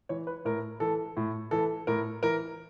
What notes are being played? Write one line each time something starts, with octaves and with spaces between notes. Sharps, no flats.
E3 C#5
B4
A2 A#4
E3 A4
A2
E3 A4
A2 A#4
E3 A#4